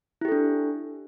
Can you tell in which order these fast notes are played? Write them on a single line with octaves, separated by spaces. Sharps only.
E4 G4 A4 D4